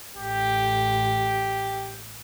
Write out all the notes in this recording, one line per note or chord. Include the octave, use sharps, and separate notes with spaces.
A1 G4